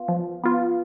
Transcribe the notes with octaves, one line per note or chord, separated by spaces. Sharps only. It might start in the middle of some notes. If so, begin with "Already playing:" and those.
Already playing: B3 F4
F3
B3 F4